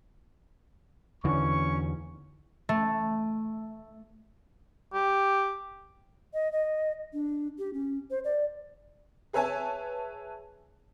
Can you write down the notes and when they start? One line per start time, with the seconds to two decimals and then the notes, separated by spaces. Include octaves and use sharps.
1.24 E2 D3 E3 C#4 C#6
2.69 A3
4.93 G4
6.34 D#5
6.53 D#5
7.13 D4
7.58 G4
7.73 C#4
8.11 C5
8.25 D5
9.33 G#4 B4 C#5 E5 G#5 A5